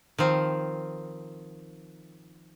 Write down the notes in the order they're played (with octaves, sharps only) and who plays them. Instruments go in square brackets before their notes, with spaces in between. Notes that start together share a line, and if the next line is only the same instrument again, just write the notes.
[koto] D#3 F3 C4